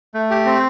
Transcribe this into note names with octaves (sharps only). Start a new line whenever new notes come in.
A3
G4
C4